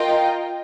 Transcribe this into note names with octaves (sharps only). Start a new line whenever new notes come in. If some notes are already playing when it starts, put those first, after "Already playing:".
Already playing: F4 A#4 D#5 G5